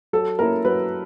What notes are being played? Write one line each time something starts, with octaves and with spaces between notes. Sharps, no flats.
F#3 A4
A#3 C#4 E4 A#4
F#3 B4